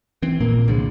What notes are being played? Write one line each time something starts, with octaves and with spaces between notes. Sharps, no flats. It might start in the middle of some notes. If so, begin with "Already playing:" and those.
E3 C4
A#1 G2 A#2 A#3
C2 D3 F3 G#3